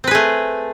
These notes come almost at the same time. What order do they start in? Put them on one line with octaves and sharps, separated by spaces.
C4 B4 G#4 A3